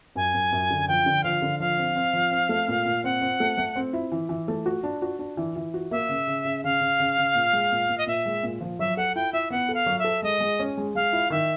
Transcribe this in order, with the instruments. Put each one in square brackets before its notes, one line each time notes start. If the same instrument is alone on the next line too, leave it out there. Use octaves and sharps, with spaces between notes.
[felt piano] F#2 [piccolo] G#5
[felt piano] F#2
F#2
D3
[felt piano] F3 [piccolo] G5
[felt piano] D3
[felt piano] F3 [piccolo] F5
[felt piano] D3
[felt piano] F3 [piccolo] F5
[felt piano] C4
C4
F3
C4
A3
A#2
A#2
[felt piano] C4 [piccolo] F#5
[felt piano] C4
A3
A3
C4
E4
E3
E3
A3
F#4
D4
F#4
D4
E3
E3
F#4
[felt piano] A#3 [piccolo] E5
[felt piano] C#3
C#3
C#3
[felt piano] C#3 [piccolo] F5
[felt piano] C#3
C#3
C#3
A#2
G#3
A#2
A#2
[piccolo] D#5
[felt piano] A#2 [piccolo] E5
[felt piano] G#3
A#2
F3
[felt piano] F#3 [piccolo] E5
[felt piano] A4 [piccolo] F#5
[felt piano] E4 [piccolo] G5
[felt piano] E4 [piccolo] E5
[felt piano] B3 [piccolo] F#5
[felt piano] A4
[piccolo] F5
[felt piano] F#3
[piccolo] E5
[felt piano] A4
[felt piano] G#3 [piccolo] D#5
[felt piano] G#3
C#4
G#3
[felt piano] G#3 [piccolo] F5
[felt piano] E4
[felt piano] D#3 [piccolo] E5